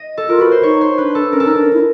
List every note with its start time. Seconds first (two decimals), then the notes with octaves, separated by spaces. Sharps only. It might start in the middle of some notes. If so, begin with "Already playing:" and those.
Already playing: D#5
0.17 A4
0.29 F4 A#4
0.40 F#4 B4
0.52 C5
0.63 D#4 C#5
0.81 C5
0.98 D4 B4
1.15 A4
1.32 C#4 A#4
1.40 A4
1.46 D#4 A#4
1.57 D4
1.73 E4